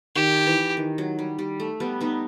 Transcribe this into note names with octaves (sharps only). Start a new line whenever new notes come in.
D#3 G4
E3
D#3
F#3
G3
G3
A3
G3 B3
B3 D#4